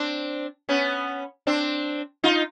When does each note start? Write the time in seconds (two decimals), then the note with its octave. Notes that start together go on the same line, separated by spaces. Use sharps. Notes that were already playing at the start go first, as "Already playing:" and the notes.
Already playing: C4 D4
0.69 B3 C#4
1.47 C4 D4
2.24 D#4 F4